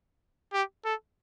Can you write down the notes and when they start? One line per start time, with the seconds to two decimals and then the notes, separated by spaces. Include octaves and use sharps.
0.53 G4
0.85 A4